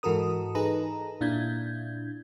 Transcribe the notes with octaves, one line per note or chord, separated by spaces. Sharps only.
G#2 E3 F#4 A4 A#4 D#6
D#4 G#4 A4 B4 A#5
A#2 D4 E4 G6 G#6